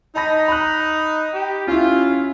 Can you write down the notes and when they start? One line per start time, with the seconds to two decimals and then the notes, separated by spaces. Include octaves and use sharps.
0.16 D#4 A5 B5 A#6
0.48 B5 F#6
1.34 G4
1.67 C#4 E4 F4